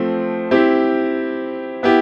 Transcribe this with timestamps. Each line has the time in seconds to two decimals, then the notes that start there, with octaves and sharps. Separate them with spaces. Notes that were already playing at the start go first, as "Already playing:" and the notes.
Already playing: F3 A3 C4
0.51 C4 E4 G4
1.83 B3 E4 G4